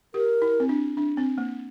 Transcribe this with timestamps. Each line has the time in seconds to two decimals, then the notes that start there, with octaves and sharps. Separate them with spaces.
0.14 G4 A#4
0.42 E4
0.60 C4
0.69 D4
0.97 D4
1.17 C4
1.38 A#3